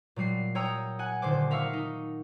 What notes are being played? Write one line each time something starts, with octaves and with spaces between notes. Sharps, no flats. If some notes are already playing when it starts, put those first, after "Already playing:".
A#2 F#3 G3 C7
C#5 G5 A#5 D#6 E6 G6
F#5 G#5 F#6
D#1 D3 C5 D6
A#4 E5 F5 C#6 E6
D#4